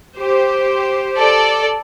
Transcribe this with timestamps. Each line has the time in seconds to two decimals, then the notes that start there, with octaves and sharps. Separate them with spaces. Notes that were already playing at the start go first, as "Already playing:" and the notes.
0.18 G4 C5
1.17 A4 D5